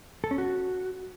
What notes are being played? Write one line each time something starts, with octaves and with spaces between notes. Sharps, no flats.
A4
C#4
F#4